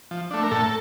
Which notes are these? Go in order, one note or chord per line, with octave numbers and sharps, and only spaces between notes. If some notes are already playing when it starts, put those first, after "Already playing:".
F3
A3 D4
A#4
A2 A4